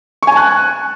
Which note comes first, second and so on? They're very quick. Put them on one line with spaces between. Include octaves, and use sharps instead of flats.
C#6 G#5 A5 F#6